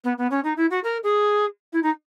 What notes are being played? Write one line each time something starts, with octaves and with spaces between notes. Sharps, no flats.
B3
B3
C#4
D#4
E4
F#4
A#4
G#4
E4
D#4